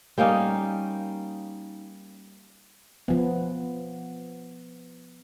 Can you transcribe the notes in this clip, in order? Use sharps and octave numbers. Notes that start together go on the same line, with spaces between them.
G3 A#3 C#4 D#4
F3 B3